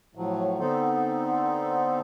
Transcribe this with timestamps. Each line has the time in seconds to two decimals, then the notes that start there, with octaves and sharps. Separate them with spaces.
0.15 A2 F3 F#3
0.60 D3 B3 C4 D#4 A4 C5